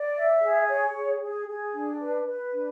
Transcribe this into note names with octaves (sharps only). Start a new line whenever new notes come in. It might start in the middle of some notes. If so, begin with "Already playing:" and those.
Already playing: D5
E5
G#4
C#5
G#4
G#4
G#4
D4
B4
B4
D4